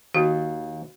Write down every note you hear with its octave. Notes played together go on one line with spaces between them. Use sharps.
D#2 F#4